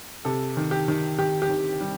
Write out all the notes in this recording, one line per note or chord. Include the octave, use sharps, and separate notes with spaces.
C3 A4
D#3
G4
D#3
D#3 G4
G4
D#3
G3